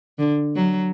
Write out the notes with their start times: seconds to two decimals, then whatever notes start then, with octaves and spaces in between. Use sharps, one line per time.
0.19 D3
0.56 F#3